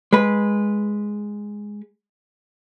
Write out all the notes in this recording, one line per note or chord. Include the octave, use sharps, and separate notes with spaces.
G#3 B4